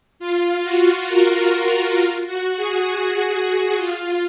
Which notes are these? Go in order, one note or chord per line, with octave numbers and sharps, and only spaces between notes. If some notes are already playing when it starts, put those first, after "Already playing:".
F4
F#4
A#4
F#4
F4
F#4
G#4
G#4
F#4
F4